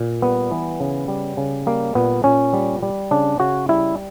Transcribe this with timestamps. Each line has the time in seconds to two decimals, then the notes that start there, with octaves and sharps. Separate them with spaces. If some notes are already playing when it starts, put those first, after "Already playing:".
Already playing: A#2
0.22 G3 B3
0.51 E3
0.80 C#3
1.08 G3
1.37 C#3
1.66 G3 A#3
1.95 A#2 B3
2.24 A#2 C#4
2.53 G3
2.83 G3
3.11 C#3 D4
3.40 C#3 F#4
3.69 G3 E4